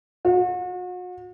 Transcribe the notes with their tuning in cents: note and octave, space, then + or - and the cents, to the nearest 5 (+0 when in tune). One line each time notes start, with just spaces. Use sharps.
F#4 -40